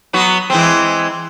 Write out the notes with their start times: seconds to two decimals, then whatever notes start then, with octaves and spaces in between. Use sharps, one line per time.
0.13 F#3 B3 F#4
0.50 E3 G#3 C4